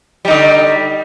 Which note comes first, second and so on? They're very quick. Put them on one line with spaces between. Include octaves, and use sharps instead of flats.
G3 D#4 D3